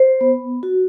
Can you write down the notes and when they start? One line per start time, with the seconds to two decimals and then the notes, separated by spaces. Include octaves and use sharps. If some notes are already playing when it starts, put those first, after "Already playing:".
Already playing: C5
0.21 B3
0.63 F#4